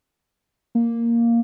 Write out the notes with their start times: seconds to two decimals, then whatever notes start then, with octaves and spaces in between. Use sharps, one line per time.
0.75 A#3